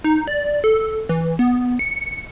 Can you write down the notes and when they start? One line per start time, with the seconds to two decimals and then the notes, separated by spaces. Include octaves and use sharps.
0.04 D#4
0.27 D5
0.64 A4
1.09 E3
1.39 B3
1.79 C#7